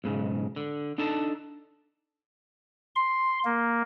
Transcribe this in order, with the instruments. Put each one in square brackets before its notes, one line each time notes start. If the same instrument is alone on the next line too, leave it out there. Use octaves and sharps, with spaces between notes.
[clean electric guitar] B1 G#2 C#3
D3
D4 D#4 A4 A5
[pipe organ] C6
A#3